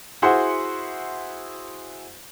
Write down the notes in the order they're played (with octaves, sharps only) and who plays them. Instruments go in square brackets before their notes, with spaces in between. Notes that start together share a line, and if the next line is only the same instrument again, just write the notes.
[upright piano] E4 F#4 G#4 C5 F#5 C6